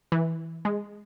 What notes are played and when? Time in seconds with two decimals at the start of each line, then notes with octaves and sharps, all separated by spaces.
0.12 E3
0.65 G#3